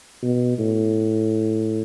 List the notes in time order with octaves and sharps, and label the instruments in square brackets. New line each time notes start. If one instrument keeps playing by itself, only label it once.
[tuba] B2
A2